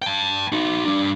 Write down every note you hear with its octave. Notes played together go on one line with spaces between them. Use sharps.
G5 A5
D#4 F#4
G3 D4